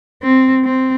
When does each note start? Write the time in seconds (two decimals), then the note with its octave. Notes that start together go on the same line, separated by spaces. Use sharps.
0.22 C4
0.64 C4